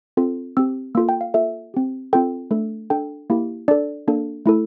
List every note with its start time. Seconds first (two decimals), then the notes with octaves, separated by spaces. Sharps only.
0.17 C4 F4 A4
0.57 C4 G4 E6
0.95 A#3 F4 A4 E6
1.09 G5
1.21 F5
1.34 A#3 F4 A4 E5
1.74 C4 G4
2.13 C4 F4 A4 G5
2.51 A3 D4 A4
2.90 D4 A4 G5
3.30 A#3 E4 G4
3.68 D4 A4 D5
4.08 A#3 D4 A4
4.46 A3 E4 A4